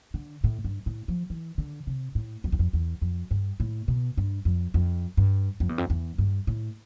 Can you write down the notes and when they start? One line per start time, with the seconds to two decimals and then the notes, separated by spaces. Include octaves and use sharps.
0.14 D3
0.44 A2
0.64 G2
0.86 A2
1.08 F3
1.30 E3
1.58 D3
1.87 C3
2.15 A2
2.44 F2
2.52 E2
2.59 F2
2.73 E2
3.01 F2
3.31 G2
3.60 A2
3.88 B2
4.17 G2
4.45 F2
4.74 F2
5.17 G2
5.60 F2
5.69 E2
5.78 F2
5.90 E2
6.18 G2
6.47 A2